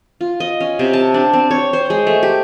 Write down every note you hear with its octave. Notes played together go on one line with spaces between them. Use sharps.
F4
D#5
C#4
C3
A5
D4
C4
C#5
C5
G#3
A3
G4